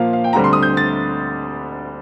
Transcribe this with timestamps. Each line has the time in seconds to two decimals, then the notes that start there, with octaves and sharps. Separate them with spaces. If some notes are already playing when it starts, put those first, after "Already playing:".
Already playing: A#2 F3 A#3 F5
0.13 F5
0.24 G5
0.33 D2 D3 G3 C4 A#5
0.44 C6
0.53 D#6
0.63 G6
0.77 A6